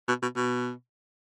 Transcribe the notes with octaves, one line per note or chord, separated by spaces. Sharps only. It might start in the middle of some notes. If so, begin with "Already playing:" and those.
B2
B2
B2